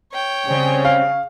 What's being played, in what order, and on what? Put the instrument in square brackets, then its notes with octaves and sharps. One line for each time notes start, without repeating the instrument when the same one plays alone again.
[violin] C#5 G5
[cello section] C#3 [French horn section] G3 C4 C#4
[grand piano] F5